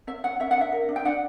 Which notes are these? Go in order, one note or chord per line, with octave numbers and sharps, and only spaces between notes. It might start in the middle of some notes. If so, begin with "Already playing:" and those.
C#4 E5
C#4 F#5
C#4 E5
F#5
D4 E5
A#4
D4
G5
D4 F#5